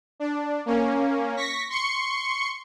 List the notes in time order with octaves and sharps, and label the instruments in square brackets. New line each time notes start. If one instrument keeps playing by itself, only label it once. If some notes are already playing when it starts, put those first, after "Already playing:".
[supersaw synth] D4
A#3 C#4
C#6 A#6 B6
C6 C#6 C#7